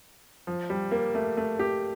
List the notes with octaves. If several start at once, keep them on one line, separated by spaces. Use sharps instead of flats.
F3
G3
A#3
A3
A3
G4